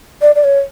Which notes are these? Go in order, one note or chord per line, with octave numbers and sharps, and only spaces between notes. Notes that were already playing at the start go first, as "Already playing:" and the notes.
D5
D5
C#5